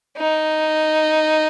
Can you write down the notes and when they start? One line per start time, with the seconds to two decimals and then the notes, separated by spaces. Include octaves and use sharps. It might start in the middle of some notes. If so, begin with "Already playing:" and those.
0.17 D#4